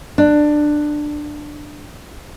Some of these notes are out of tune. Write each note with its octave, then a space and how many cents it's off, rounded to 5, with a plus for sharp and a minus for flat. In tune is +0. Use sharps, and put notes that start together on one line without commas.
D4 +15